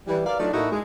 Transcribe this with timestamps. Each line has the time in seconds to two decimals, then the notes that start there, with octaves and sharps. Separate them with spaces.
0.07 E3 G3
0.26 A#4 D5 F5
0.40 F#3 A3 D4 D#4 F4 D5
0.53 A2 A3 A#3 D#4 E4 F#4
0.71 G#3